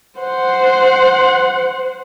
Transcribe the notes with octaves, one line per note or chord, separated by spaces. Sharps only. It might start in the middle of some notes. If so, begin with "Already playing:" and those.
C5 F#5